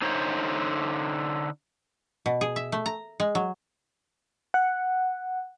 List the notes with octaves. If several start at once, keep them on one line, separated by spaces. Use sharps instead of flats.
D3 D#4 C5 C#5
B2
G#4
E5
A3
A#5
G#3
F#3
F#5